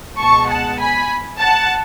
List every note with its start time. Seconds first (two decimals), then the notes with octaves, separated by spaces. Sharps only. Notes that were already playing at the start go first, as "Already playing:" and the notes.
0.19 C#2 B2 G#3 A5 C#6
0.49 F#5 A5
0.79 G#5 B5
1.40 F#5 A5